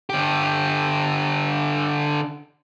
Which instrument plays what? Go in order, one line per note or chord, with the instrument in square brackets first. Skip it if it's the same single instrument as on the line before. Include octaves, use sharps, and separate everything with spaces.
[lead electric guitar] D3 G4